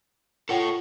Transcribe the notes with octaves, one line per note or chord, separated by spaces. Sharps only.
F4 A4 C#5 F#5 G5